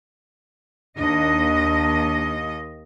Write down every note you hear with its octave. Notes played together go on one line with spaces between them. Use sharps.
D#2 D4 D#5